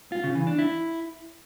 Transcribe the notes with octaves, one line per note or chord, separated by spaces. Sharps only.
F4
C#3
E3
D4
E4